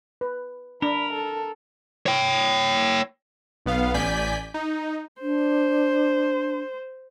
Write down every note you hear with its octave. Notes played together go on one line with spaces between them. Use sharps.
B4
D4 A#4 B5
A4
C#5 G5
B1 B3 F5
A1 D5 G#5 G6 B6
D#4
D4 C5